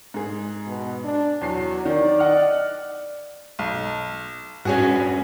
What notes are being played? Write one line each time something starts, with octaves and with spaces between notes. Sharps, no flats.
G#2 G#4
B2
D4
E2 F#3 C7
D#3 D5
D#5 F#5 F6
B1
G2 C#4 F#4 G#4 C#5